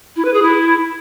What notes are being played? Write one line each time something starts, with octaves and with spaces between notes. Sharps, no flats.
E4
B4
G#4
E4